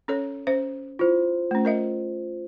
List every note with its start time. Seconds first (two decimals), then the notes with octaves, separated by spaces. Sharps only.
0.08 C#4 A4 C#5
0.47 C#4 C5 E5
0.99 E4 F4 C5
1.51 A3 C#4
1.65 A#4 D#5 E5